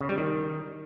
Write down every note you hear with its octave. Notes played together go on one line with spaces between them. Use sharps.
C#3
G3
D#3